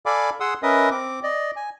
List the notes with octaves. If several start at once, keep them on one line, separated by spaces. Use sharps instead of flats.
A4 D5 F5 G#5 B5 D6
G#4 F#5 C6 D#6 E6
C#4 A#4 B4 D#5 E5 D#6
C4 D6
D5 D#5
G#5